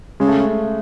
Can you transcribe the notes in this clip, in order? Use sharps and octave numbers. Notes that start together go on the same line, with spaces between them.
C#3 G#3
A3